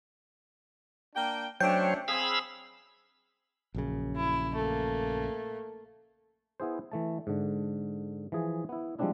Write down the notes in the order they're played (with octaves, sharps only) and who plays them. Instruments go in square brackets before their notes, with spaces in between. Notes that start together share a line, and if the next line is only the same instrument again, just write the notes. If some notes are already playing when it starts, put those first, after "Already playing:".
[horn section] A#3 D4 G5
[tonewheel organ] F#3 C5 C#5 [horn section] A3 C#4 D4 [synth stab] G5
[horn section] C4 G#4 [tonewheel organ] F5 B5 E6
[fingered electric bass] A#1 F#2 C#3
[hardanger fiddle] E4
A3 A#3
[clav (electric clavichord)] B3 E4 G#4 C5
E3 A3 A5
G#2 D3
E3 F3 G#4
B3 E4
F3 G3 G#3 C4 D4 E4